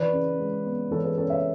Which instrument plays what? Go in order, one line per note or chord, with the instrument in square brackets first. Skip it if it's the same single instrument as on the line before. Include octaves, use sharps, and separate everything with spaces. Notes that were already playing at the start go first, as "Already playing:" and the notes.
Already playing: [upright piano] E3 B4 D5
C#3
G#3
B3
E3 A4 C#5
G#4 B4
C#3 A4 C#5
C#5 E5